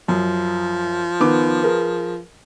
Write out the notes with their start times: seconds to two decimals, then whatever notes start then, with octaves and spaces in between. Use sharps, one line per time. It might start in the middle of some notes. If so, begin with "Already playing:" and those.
0.08 F#2 F3
1.20 D#3 B3 D6
1.62 G#4 A#4 B4